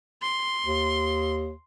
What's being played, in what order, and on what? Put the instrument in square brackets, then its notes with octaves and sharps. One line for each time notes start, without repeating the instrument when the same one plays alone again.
[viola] C6
[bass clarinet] D#2